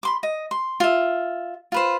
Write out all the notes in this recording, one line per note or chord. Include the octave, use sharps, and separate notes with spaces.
B5 C6 D6
D#5
C6
F4 E5
F4 B4 C5